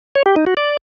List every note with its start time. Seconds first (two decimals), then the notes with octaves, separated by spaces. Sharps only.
0.15 C#5
0.26 G4
0.36 D#4
0.47 F#4
0.57 D5